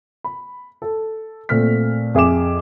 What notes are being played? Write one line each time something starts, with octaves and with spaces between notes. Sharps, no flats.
B5
A4
A#2 A3 C4 F6 B6
F2 G#4 E5 D6 E7